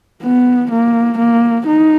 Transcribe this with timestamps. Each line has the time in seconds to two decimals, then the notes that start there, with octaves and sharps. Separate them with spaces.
0.23 B3
0.71 A#3
1.18 A#3
1.67 D#4